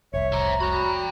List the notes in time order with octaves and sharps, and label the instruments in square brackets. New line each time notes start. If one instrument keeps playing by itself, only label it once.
[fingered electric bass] F1 C2 [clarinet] C#5 [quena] E5
[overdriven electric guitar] C5 E5 [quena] A#5
[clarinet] F#4 [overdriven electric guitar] G5 B5